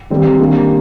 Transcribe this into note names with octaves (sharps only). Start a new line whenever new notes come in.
D#3 G3 C4 D#4
D#3 G3 A#3 D4 G4